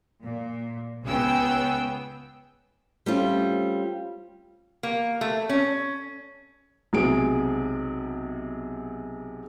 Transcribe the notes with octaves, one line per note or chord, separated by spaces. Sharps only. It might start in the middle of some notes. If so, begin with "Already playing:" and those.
A#2
C#2 C#3 B3 G#4 G5 E6
G3 A3 C4 C#4 F4
A#3
A3
C#4
B1 C3 G#3 G#4 D7